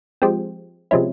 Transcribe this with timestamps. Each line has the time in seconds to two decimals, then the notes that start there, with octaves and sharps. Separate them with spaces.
0.22 F3 G#3 C4 G4
0.91 C3 F3 G#3 C#4 E4